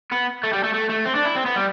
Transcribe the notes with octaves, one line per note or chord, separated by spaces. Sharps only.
B3
A3
G3
A3
A3
A3
C4
D4
E4
C4
B3
G3